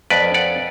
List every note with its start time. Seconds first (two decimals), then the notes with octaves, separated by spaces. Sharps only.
0.10 F2 B4 D5
0.34 D5 F#5